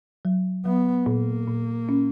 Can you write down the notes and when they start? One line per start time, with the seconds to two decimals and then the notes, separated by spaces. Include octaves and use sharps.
0.25 F#3
0.65 F#3 B3
1.06 A#2 A#3
1.48 A#2
1.89 C#4